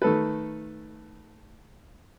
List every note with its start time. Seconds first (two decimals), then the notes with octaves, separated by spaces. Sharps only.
0.02 D#3 A3 A4 B4